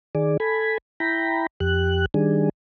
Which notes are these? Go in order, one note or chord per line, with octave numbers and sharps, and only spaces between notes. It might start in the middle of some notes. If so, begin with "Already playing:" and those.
D#3 G#4 D5
A4 G#5 B5
E4 G5 A#5 B5
F2 G4 F#6
D#3 G3 D4 G#4